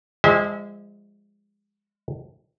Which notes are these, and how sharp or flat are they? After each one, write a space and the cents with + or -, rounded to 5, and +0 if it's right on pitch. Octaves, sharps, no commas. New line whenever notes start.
F3 +0 G#3 -25 E5 -40